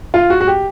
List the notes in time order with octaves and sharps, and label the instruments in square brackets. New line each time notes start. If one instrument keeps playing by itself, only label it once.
[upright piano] F4
F#4
F#4
G4